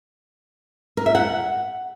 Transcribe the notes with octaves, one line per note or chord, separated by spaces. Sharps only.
A#4
E5
F#5